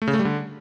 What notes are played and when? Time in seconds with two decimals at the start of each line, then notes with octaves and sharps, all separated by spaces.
0.02 A3
0.07 C#3
0.13 A3
0.19 G3
0.25 D3